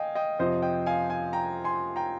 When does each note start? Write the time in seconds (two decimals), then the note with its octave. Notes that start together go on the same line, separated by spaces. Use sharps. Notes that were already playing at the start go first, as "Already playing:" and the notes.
Already playing: D#5 F5 G5 G#5
0.15 D#5 G5
0.39 F2 C3 F3 C5 D#5
0.62 D#5 G5
0.86 F5 G#5
1.10 F5 G#5
1.33 G5 A#5
1.64 G#5 C6
1.96 G5 A#5